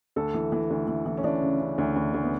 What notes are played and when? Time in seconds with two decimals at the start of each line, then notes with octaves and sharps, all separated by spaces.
0.16 D2 A4
0.34 E3
0.52 E3
0.70 D2
0.87 E3
1.06 E3
1.17 C#4
1.24 E3 D4
1.42 C#3
1.60 C#3
1.78 D2
1.96 D2
2.14 D2
2.23 B3